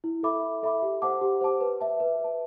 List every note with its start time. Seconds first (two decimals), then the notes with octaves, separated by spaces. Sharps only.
0.04 E4
0.23 A4 E5 B5 D6
0.43 E4
0.63 A4 E5 B5 D6
0.82 G4
1.02 C5 F#5 A5 D6
1.21 G4
1.41 C5 F#5 A5 D6
1.61 B4
1.81 E5 A5
2.00 B4
2.20 E5 A5